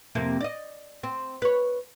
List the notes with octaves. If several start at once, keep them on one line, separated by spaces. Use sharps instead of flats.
F2 C3 A#3
D5 D#5
C4
B4 C#5